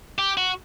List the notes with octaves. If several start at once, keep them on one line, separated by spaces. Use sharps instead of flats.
G4
F#4